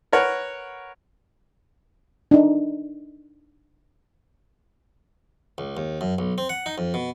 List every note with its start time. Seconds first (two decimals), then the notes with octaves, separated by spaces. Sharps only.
0.13 A#4 B4 C#5 F#5
2.31 D4 D#4
5.58 C#2
5.77 D#2
6.01 F#2
6.18 B1
6.38 C4
6.49 F#5
6.66 D#4
6.78 F2
6.94 B2